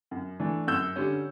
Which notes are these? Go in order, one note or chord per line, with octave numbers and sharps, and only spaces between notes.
F#2
E3 A3 D4
F#2 E6 G6
D3 G3 C#4